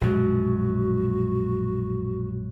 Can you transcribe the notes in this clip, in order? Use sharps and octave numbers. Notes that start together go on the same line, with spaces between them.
A#1 F#2 B2 G#3 F#4